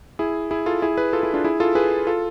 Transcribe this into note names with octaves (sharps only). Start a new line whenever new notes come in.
E4 G#4
E4 G#4
F4 A4
E4 G#4
G#4 B4
F4 A4
E4 G#4
D4 F4
E4 G#4
F4 A4
G#4 B4
F4 A4